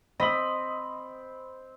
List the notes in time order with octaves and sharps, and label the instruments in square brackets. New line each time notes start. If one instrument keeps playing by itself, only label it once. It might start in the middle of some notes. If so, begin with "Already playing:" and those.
[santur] C4 [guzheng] D#5 [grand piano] B5 B6 F#7